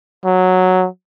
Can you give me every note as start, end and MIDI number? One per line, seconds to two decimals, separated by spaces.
0.25 0.87 54